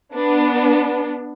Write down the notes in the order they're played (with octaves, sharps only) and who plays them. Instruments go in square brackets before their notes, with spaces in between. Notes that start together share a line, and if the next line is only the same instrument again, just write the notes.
[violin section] B3 D4